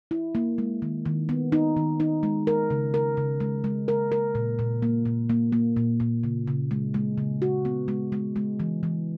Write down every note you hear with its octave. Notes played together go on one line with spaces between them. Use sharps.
E4
A#3
G#3
D#3
D#3
B3
D#4
D#3
D#4
G#3
A#4
C#3
A#4
C#3
G#3
G#3
A#4
A#4
A#2
A#2
A#3
A#2
A#3
A#3
A#2
A#2
C#3
C#3
G#3
G#3
C#3
F#4
B3
G#3
G#3
G#3
E3
E3